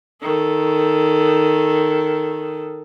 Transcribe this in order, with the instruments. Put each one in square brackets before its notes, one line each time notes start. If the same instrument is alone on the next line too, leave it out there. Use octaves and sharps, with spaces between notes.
[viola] D#3 A4